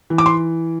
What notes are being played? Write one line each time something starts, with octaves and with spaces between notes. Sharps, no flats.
E3
D6
C6